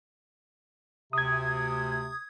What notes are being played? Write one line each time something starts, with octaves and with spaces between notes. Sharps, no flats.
D2 C3 D#6 G#6